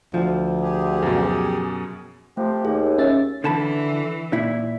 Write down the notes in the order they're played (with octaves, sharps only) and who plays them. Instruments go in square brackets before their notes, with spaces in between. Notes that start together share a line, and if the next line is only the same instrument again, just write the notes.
[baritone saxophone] D2 [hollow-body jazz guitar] F3
[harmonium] G4 G#4
[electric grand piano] F#2 B2
[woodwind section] C3 F3 G4 [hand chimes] A3
[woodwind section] D#2 [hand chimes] G#4
[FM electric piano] C#4 E5 A6
[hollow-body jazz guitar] D3 A5 B5 [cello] E3
[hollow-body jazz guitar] A#2 E4